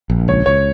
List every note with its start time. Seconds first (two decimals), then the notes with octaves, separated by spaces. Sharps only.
0.10 A#1
0.28 C#2 C#5
0.46 C#2 C#5